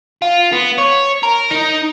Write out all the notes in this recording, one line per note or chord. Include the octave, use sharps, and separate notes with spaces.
F4
B3
C#5
A#4
D#4